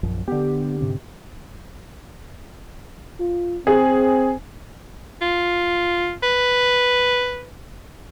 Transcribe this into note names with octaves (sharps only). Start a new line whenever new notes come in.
A#1 F#2 F3
D3 B3 G4
G#2 C3 C4
F4
C4 G#4
F4
B4